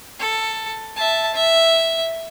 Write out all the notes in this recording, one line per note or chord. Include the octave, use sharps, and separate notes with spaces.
A4
E5 A5
E5